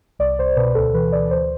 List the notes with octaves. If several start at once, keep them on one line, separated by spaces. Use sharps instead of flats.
C2 D5
C2 C5
B2 B4
D2 A4
E3 B4
D2 D5
D2 C5